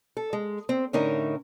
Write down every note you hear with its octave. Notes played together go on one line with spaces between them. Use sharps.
A4
G#3
C4
A2 D3 C#4 D#4 A#4 E5